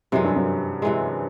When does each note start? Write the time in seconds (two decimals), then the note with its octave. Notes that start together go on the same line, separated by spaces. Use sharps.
0.12 F#2 C3 E3 G#3
0.24 G2
0.36 F#2
0.82 C3 E3 G#3